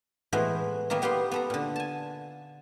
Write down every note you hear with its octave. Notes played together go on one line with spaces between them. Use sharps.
A2 E3 G#3 B3 F#4 C5
D#3 F#3 A#3 B3
G3 B3 G4 F5 C6
B3 A4 A#5
A#2 D3
G#5 A5